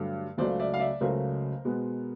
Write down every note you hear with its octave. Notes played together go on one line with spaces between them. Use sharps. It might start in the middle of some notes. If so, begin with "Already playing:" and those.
Already playing: G2 D3 F#3 A3
C#2 C#3 F#3 A3 C5 D5
D5 E5
F5
D5 E5
C#2 C#3 F#3 A3 A#4 C5
B2 G#3 B3